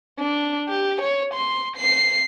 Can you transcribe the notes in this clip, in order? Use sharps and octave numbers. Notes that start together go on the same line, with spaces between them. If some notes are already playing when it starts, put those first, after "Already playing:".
D4
G4
C#5
C6
C7